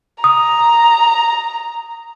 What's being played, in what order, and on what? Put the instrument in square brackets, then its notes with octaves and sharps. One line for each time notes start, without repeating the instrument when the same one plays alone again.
[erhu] A#5 [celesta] D#6